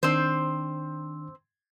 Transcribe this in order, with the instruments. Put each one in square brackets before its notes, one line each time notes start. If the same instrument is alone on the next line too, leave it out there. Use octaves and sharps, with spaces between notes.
[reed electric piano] D#3 D4 [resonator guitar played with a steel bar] C4 C5